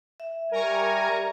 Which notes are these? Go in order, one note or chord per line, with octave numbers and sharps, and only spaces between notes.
E5
G3 A#4 G#5 A#5 C#6